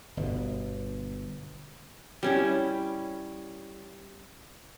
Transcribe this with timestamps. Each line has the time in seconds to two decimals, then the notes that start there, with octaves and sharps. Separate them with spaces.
0.17 G1 B2
2.23 G3 C#4 E4